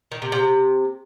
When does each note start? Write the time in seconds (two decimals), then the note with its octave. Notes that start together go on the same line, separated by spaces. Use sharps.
0.12 D#3
0.22 C3
0.32 C3